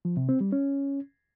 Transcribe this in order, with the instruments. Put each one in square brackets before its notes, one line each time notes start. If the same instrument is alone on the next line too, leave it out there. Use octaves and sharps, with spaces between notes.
[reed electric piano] F3
C3
C4
G3
C#4